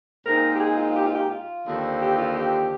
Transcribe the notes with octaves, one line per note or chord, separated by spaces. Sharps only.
A#2 G#3 C4 D#4 A#4
G4
G#4
F4
G4
F4
G4
F4
D#2 D3 F3 C4
G4
F4
G4